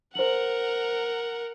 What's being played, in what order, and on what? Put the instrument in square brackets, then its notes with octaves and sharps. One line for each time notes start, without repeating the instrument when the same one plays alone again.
[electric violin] A#4 F#5 [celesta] C5 F#7